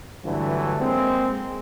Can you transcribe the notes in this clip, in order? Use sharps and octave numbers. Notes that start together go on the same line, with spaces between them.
G2 D3 E3 F#3 A3
G#3 A#3 C4